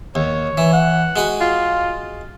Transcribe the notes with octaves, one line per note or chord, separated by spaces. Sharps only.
D#2 C#5
E3
F#5
G#3 F#4 B5
F4